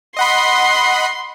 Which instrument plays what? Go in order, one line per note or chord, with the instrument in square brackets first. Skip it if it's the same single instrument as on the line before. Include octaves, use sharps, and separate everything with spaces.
[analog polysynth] D#5 F#5 B5 [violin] C6